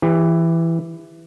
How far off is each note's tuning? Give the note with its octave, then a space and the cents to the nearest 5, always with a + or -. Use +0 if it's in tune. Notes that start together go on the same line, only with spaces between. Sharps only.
E3 +10 G4 +35